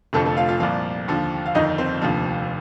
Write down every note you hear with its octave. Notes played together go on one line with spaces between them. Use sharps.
F1 F2 D3 F3 A3 A4
A3 A4
F4 F5
F4 F5
C2 A#2 F3 F4 F5
D#2 D3 F3
F5
G1 F2 D#3 D#4 D#5
C4 C5
F1 D#2 D3 F3